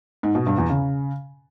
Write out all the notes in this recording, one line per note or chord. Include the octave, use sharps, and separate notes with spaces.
G#2
B2
G2
E2
C#3